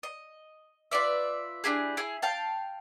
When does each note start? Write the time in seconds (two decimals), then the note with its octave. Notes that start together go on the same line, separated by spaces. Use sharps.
0.03 D#5
0.91 F4 B4 D5 E5
1.64 D4 E4 G4 G#4
1.97 E4 G#4
2.22 F5 G5 A5